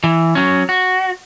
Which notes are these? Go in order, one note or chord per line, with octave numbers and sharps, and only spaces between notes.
E3
F#3 C#4
F#4